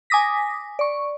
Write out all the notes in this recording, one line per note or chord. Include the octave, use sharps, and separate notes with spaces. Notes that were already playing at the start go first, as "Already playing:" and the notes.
G#5 D6 D#6 A#6 B6
D5 C#6